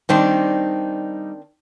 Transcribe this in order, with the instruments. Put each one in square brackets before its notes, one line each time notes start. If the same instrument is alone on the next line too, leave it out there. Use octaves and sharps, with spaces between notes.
[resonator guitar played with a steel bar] D#3 C4 D4 [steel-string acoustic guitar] G3 D#4